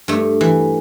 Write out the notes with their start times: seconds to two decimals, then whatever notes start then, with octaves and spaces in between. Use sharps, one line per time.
0.08 G2 A3
0.41 E3